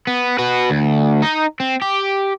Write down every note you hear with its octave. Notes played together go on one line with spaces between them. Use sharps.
B3
F#4 B4
D2
D#4
C4
G4